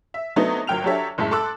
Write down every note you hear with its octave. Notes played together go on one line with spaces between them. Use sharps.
E5
F#3 A3 B3 C4 D4 D#4
G1 F#3 A#4 G5 F6 F7
F#3 D4 G4 A4 C#5 E5
F#1 A2 G#3 E4 E5 A5
A4 A5 C6 D6 E6 F#6